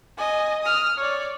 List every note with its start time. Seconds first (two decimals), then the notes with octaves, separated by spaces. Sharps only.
0.17 D#5 G#5
0.62 D#6 F6
0.98 C#5 D5